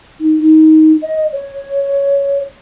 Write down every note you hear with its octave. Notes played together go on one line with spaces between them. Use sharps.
D#4
D#4
D#5
C#5